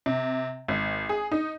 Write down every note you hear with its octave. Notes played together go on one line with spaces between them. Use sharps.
C3
G#1
G#4
D#4